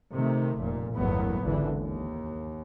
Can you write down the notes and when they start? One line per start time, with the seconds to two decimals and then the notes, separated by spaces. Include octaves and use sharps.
0.12 C3 D#3 A3
0.60 F1 A#2
0.93 G1 E2 A2 F#3 A#3 B3
1.43 G#1 C#2 D3 E3
1.77 D#2